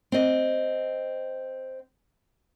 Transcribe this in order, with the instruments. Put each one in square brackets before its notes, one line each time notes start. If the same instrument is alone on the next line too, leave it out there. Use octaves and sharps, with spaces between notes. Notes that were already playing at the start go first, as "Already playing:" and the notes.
[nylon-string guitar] C4 D#5